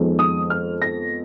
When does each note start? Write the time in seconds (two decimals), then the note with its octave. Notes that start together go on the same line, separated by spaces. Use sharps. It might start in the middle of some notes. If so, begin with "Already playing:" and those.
Already playing: F2 D#3 G#3 B3
0.19 D#6
0.50 F6
0.82 A#6